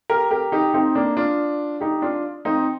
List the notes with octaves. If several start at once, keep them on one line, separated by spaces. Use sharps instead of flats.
G4 A#4
G4 A#4
D#4 G4
C4 D#4
A#3 D4
D4 F4
D#4 G4
D4 F4
C4 D#4